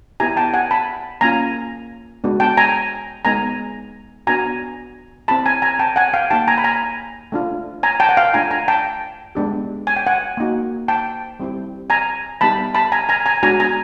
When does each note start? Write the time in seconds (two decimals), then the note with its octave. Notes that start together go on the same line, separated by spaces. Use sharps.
0.20 B3 E4 G4 G#5 A#5
0.37 G5 A5
0.54 F#5 G#5
0.71 A5 B5
1.21 A#3 C#4 F4 G#5 A#5
2.24 G#3 B3 D4 F#4
2.40 G5 A5
2.57 G#5 A#5
3.25 G#3 B3 D#4 G#5 A#5
4.27 B3 D4 F#4 G#5 A#5
5.28 C4 E4 G4 A5 B5
5.46 G#5 A#5
5.62 G#5 A#5
5.79 G5 A5
5.96 F#5 G#5
6.14 F5 G5
6.30 A#3 D#4 G4 G5 A5
6.48 G#5 A#5
6.58 B5
6.64 G#5 A#5
7.32 A3 D4 F4
7.83 G#5 A#5
8.00 G5 A5
8.09 F#5
8.17 F5 G5
8.34 A3 D4 F4 G#5 A#5
8.51 G#5 A#5
8.68 G5 A5
9.35 G#3 B3 D4 G4
9.87 G#5
9.96 G5
10.07 F#5 G#5
10.37 A#3 D#4 F#4
10.88 G5 A5
11.40 G3 C4 E4 G4
11.90 G#5 A#5
12.41 G3 B3 D#4 G4 A5 B5
12.75 A5 B5
12.92 G#5 A#5
13.09 G#5 A#5
13.26 G#5 A#5
13.43 G#3 B3 D4 F#4 G#5 A#5
13.60 G#5 A#5